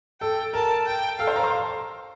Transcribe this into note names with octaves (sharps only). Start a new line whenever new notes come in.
A4 G5
A#4 A5
G5
A4 F5
C5
A#5
C6